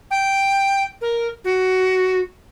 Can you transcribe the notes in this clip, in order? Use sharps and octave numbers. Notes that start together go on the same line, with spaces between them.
G5
A#4
F#4